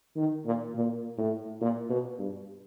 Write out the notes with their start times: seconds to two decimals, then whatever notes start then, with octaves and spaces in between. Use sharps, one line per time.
0.16 D#3
0.45 A#2
0.75 A#2
1.18 A2
1.61 A#2
1.90 B2
2.19 G2